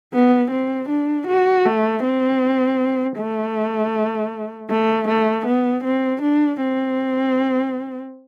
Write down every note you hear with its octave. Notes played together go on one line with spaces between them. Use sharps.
B3
C4
D4
F#4
A3
C4
A3
A3
A3
B3
C4
D4
C4